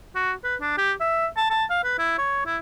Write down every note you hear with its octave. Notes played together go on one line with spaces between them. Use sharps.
F#4
B4
D4
G4
E5
A5
A5
F5
B4
E4
C#5
E4